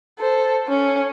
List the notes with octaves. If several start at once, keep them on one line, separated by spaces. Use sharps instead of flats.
A4 C5
C#4